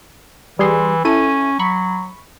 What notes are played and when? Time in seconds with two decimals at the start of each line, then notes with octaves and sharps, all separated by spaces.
0.59 E3 G3 G#4 C6
1.05 C#4 E4 A4 D#7
1.59 F#3 B5 C#6